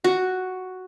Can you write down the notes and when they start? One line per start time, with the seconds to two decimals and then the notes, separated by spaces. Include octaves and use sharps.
0.04 F#4